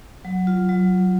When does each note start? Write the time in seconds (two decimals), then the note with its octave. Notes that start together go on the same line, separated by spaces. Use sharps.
0.25 F#3
0.47 F4
0.69 F#3